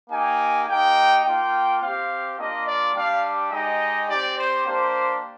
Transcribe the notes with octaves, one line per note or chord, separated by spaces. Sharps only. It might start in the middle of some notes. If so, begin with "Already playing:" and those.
A#3 D#4 G4 G#5
A#3 D#4 G4 G5
A#3 F4 G5
C4 G4 F5
A#3 D4 F4 D#5
D5
G3 D4 G4 F5
G#3 D#4 G4 D#5
C4 G4 D5
C5
A#3 D4 G4 C5